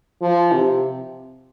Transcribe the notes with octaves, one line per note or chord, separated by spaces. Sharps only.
F3
C3